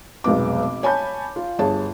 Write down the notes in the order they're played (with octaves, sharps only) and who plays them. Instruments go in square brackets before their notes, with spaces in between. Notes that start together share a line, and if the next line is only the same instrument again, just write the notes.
[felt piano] F1 B1 G#3 B3 D6
C#5 G#5 A5 B5 G6
F4
G1 G#4 C#5 A5